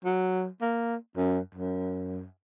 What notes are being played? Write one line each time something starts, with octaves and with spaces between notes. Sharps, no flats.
F#3
A#3
F#2
F#2